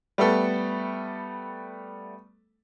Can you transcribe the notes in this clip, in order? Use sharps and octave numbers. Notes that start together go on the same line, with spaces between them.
G3 A3 B3 A4